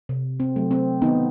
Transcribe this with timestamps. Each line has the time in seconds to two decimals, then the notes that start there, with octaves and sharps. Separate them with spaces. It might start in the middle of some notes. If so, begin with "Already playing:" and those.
0.09 C3
0.40 C4
0.56 F#3 A3
0.71 C4
1.02 D#3 B3 D#4